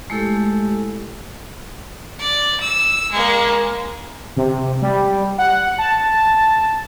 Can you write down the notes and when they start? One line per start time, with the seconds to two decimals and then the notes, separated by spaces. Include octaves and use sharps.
0.10 G#3 A3 E4 G4 A4
2.19 D5
2.60 E6
3.11 G#3 A#3
4.37 C3
4.82 G3
5.38 F#5
5.78 A5